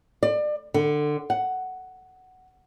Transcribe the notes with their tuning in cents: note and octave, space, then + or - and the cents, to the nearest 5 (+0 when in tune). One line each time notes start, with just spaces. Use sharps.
D5 +30
D3 +20
F#5 +10